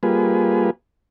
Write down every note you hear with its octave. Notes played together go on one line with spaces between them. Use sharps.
G3 A#3 F4 G#4 B4